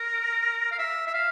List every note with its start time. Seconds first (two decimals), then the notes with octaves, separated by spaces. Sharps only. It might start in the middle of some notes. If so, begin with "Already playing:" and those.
Already playing: A#4
0.72 F5
0.79 E5
1.07 E5
1.14 F5